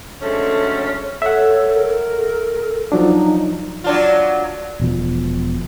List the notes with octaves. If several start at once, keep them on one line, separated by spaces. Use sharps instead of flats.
D3 F#3 G#3 A3 C4 C#4
A4 C#5 E5 F#5
A#4
A4
F3 F#3 D4 D#4
F#3 D4 F4
E1 B2 F3